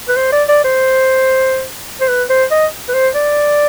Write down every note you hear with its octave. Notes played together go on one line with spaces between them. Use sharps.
B4
C5
D5
D5
C5
C5
B4
C5
D#5
B4
C5
D5